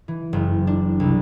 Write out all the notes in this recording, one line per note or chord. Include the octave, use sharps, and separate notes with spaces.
E3
F#1
D4
C2